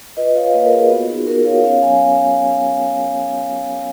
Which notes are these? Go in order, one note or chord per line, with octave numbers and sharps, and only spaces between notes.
F4 B4 D#5
F4 C#5 F5
A#3 B4 D#5
A#4
F4 G#4
B3 F#4
D#4 G#4
B3 F#4 A#4
B3 C#5 F5
C#4 C#5 F5
F#3 F5 G#5